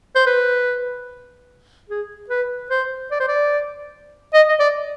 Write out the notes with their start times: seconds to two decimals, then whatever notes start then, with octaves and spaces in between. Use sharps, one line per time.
0.15 C5
0.27 B4
1.90 G#4
2.30 B4
2.70 C5
3.11 D5
3.20 C5
3.28 D5
4.34 D#5
4.49 D#5
4.60 D5